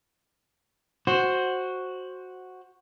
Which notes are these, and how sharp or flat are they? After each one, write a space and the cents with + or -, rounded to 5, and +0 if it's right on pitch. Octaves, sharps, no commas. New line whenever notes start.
F#4 +0 C5 +10